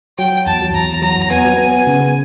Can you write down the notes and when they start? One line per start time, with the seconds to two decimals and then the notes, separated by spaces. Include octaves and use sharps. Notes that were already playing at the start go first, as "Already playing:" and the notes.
0.18 F#3 G5
0.46 E2 A5
0.74 E2 A#5
1.02 F#3 A#5
1.30 B3 G#5
1.57 B3
1.87 C#3